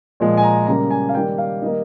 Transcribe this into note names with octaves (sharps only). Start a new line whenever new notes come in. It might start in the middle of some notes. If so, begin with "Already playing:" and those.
A#2 F3 G#3
G#5
A#5
C#3 G3 A#3 A#5
G#5
F5
D#3 G3 A#3 G5
F5
D#3 G3 A#3 D#5